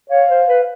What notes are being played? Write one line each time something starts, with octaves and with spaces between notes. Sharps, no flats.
C#5 F5
C5
B4